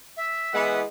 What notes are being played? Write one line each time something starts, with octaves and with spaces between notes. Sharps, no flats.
E5
E3 G#3 B3 F#5